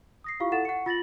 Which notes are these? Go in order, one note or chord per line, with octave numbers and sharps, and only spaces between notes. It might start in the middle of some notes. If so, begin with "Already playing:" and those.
D#6 A#6 C7
E4 F4 G4 F5 C#6
E4 A4 F#5 A6 E7
F#5 C#6 C#7
F4 A6 A#6 F#7